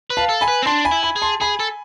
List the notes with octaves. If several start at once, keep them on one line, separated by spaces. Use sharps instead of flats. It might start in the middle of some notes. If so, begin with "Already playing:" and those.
B4
F5 A5
A4
G#5 B5
B4
C4
D4 A5 C6
G#5 B5
E4
G#5 B5
G#4
A5 C6
G#4 G#5 B5
A4